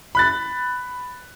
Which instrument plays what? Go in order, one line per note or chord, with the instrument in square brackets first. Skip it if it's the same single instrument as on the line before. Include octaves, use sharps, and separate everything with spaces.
[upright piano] B5 F#6 A6